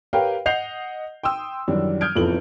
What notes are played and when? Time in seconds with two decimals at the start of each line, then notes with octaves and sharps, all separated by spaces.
0.13 G4 A#4 B4 C#5 F5 G5
0.46 D#5 F#5 G6 C7 F7
1.23 G5 C6 D#6 E6
1.68 F#2 D#3 E3 G3 D4
2.01 D#6 F6 G6 G#6 D7
2.15 F1 E2 F3 A4 B4 F#7